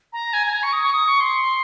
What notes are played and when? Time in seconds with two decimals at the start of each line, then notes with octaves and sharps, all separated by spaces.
0.13 A#5
0.33 G#5
0.47 G#5
0.53 A#5
0.63 C#6
0.73 D#6
0.83 C#6
0.93 D#6
1.07 C#6
1.20 C6